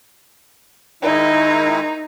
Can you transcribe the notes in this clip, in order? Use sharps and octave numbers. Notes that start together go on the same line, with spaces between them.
D#3 G#3 D#4 E4